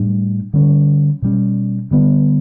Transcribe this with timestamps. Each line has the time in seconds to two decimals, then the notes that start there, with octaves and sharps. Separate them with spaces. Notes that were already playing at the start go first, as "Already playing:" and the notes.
Already playing: A2 G3 D4
0.54 D3 G3 C#4
1.22 B2 G3 C#4
1.91 D3 G3 B3